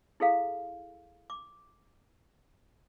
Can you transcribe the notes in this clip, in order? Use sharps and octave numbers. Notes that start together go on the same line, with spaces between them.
E4 G#4 A4 F5
D6